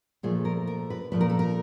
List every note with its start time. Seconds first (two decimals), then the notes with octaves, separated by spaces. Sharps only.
0.23 A#2 F3 A3 G#4
0.45 A#4
0.67 A#4
0.90 B4
1.12 A#2 F3 A3 B4
1.21 A#4
1.30 A4
1.39 A#4